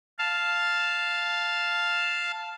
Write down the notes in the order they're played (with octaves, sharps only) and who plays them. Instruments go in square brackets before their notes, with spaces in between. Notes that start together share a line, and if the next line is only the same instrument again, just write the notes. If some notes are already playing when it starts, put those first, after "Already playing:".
[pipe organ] F5 A5